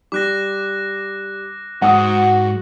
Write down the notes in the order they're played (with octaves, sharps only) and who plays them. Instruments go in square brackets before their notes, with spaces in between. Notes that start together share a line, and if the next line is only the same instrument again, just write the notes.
[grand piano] G3 [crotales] D6 F#6 A#6
[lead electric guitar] G#2 [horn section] F#4 [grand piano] F#5 D#6